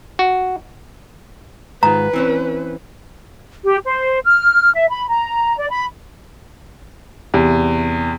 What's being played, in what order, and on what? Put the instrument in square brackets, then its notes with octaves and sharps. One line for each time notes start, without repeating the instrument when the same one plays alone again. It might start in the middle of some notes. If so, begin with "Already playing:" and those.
[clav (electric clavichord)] F#4
[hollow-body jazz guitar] G#2 D#3 F4 [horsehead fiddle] B4 [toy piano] A#5
[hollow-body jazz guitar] E3 C4 C#4
[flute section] G4
C5
F6
E5
B5
A#5
D5
B5
[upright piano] E2 C3